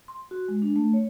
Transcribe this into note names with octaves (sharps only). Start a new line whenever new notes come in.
C6
F#4
G#3
D4
A3
C#5